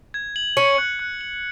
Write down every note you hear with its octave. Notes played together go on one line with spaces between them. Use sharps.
G#6
F#7
C#4 C#7
F#6
F#6
F#7